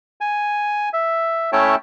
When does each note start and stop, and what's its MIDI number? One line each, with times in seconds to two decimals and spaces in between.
0.21 0.89 80
0.93 1.50 76
1.52 1.75 57
1.52 1.75 61
1.52 1.75 64
1.52 1.75 73
1.52 1.75 79
1.52 1.75 81